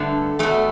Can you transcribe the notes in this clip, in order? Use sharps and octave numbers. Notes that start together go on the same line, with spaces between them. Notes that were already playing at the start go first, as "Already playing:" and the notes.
Already playing: G2 D3 A3
E2 B2 A3